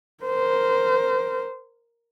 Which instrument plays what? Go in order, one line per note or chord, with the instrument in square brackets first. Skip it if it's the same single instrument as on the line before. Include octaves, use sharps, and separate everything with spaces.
[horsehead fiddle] A#4 C5